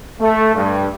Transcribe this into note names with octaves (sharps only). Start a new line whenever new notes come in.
A3
G2